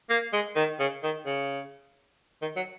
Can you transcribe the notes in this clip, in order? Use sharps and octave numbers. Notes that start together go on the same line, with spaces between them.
A#3
G#3
D#3
C#3
D#3
C#3
D#3
F#3